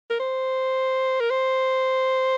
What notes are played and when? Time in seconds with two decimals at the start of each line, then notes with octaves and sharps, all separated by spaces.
0.10 A#4
0.19 C5
1.20 A#4
1.30 C5